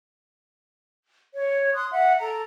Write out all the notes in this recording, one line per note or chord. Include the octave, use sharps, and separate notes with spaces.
C#5
C6 D#6 F#6
E5 F#5
A4 A#5